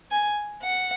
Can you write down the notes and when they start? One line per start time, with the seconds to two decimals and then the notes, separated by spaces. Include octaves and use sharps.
0.11 G#5
0.63 F#5